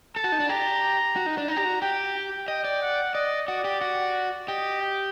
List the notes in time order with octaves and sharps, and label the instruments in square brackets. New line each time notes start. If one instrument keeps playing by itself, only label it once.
[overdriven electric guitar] A4 [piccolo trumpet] A5
[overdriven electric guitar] F#4
D#4
D4
[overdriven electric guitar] G4 [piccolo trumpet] A#5
[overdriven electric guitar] F#4
D#4
D4
[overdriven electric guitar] D#4 [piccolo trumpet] A#5
[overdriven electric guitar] G4
F#4
[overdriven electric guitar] G4 [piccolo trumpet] G5
[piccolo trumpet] G5
[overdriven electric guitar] D#5 [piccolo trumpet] G5
[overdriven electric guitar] D5
[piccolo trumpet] F#5
[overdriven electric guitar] D5 [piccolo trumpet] D#5
[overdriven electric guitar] F#4 [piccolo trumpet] D5
[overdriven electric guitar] G4
F#4
[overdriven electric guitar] G4 [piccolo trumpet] D#5
[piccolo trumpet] G5